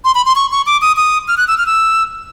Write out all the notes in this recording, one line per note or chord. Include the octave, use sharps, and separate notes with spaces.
C6
B5
C6
C#6
C#6
D6
D#6
D#6
F6
F#6
E6
F6
E6